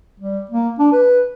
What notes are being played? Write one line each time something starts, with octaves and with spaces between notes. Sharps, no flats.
G3
A#3
D4
B4